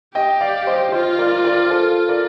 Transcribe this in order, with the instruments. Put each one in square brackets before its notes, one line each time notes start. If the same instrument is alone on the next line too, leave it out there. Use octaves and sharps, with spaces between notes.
[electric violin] G4 [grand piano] D#5 G5
[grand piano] D5 F5
C5 D#5
[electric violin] F4 [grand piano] C5 D#5
[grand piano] A#4 D5
A#4 D5
A4 C5
A#4 D5